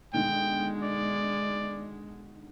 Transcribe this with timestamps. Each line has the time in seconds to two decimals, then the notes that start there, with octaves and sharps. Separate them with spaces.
0.13 B2 D3 D#3 G#3 G5
0.83 D5